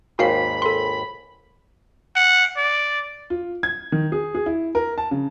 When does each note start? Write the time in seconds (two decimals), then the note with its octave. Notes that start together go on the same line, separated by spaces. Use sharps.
0.19 G#1 D#2 G#2 F#4 F5 B5 C7
0.62 A4 C6
2.16 F#5
2.57 D5
3.30 F4
3.63 G#6
3.92 D#3
4.12 G#4
4.35 G#4
4.46 E4
4.75 A#4
4.98 A5
5.11 C#3